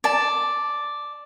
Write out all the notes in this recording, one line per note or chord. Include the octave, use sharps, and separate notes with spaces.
D5 A5